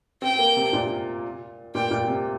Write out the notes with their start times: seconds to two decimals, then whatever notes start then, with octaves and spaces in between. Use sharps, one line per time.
0.22 C4 G5
0.39 A#3
0.57 C3
0.73 A#2
1.75 A#2 G5
1.91 A#2
2.08 C3